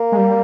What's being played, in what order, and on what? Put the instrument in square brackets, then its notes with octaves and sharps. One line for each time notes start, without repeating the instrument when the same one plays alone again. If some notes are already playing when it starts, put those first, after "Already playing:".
Already playing: [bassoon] A#3
[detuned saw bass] G#3
G3